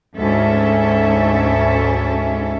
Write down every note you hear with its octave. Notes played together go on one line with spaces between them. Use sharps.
D2 G#2 C#4 A4 E5